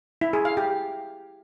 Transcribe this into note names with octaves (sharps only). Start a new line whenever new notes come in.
E4
G#4
F5
G4